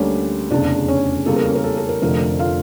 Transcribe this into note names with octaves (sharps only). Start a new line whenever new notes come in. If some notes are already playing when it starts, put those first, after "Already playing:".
Already playing: D2 D3 G3 A#3 C#4 C#5
F1 E2 C#3 D4 D5
C#4 C#5
E2 C#3 G3 A#3 A4
A#4
C#4 C#5
A#4
A4
A4
A#4
F1 F2 D3 F3 A3 A#4
F4 F5